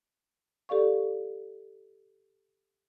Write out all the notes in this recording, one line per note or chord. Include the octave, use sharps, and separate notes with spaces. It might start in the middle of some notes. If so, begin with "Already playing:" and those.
G4 A4 D5 F5 C#6